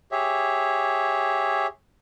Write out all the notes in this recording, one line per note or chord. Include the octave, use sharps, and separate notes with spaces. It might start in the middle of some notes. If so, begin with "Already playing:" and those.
G4 G#4 C#5 E5